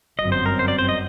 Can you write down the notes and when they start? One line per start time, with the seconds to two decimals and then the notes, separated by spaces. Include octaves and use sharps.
0.19 G1 F#2 F#3 C4 D#5
0.32 C5
0.46 A#4
0.59 C5
0.68 D5
0.79 C5
0.89 D#5